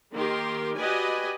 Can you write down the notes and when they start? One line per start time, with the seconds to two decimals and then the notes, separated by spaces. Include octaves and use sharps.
0.13 D#3 A#3 G4 A#4 C6
0.76 F#4 G4 B4 D5 D#5 G#5